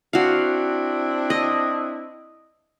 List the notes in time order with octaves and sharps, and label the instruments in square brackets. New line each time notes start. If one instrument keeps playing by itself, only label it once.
[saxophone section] C4 D4 E4 [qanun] F#4 F5
[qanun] D#5